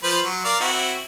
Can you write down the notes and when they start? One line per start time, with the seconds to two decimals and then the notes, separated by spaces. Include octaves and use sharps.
0.03 F3 B4 C5
0.25 F#3
0.45 A#4 D5 F5
0.60 C4 E4 F#4